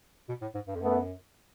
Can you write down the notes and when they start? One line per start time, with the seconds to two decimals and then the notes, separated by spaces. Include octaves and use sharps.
0.29 B2
0.41 A2
0.54 G#2
0.67 G2
0.75 F2
0.81 F#2 A3 B3